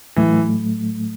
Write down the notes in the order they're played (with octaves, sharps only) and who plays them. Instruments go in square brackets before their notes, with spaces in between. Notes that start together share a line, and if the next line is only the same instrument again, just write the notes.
[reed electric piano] A2 F#3 A3 [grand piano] E3